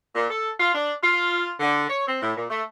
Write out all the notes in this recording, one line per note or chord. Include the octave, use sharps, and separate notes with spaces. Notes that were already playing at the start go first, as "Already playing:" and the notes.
A#2
A4
F4
D4
F4
D3
C#5
C4
A2
A#2
A3